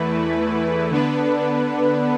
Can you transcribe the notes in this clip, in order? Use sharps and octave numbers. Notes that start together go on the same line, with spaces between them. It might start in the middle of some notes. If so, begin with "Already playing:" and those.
Already playing: E2 E3 A3 E4 B4
D3 B3 D4 B4